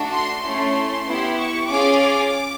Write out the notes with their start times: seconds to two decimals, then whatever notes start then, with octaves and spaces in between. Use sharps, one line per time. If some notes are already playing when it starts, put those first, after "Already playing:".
Already playing: A3 D4 F#4 A4
0.11 C6
0.42 A3 C#4 E4 A4 C6
1.06 B3 E4 G4
1.38 C#6
1.68 C#4 F4 G#4 D6
2.00 D6